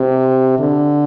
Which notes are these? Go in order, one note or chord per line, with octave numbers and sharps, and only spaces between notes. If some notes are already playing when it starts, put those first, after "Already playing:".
Already playing: C3
D3